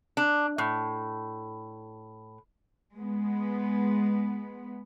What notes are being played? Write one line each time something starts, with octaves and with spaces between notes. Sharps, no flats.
D4
A2
G#3 B3